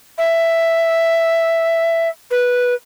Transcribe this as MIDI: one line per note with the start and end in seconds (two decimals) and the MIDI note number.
0.18 2.09 76
2.31 2.74 71